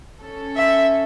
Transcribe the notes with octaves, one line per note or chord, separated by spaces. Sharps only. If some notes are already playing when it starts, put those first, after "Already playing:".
C#4 A4
E5